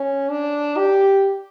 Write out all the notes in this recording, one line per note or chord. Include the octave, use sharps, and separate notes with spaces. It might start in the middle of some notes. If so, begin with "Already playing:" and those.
Already playing: C#4
D4
G4